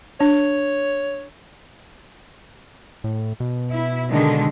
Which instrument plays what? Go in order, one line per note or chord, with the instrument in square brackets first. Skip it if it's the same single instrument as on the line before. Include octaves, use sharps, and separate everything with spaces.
[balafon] D4 [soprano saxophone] C#5
[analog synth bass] A2
B2
[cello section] E4
D3 D#3 G#3